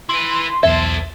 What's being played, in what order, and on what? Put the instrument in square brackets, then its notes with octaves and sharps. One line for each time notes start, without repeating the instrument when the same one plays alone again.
[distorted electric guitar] E4 B4 [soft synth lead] C6
[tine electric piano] B1 E2 G#6 [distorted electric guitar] A4 C5 [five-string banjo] E5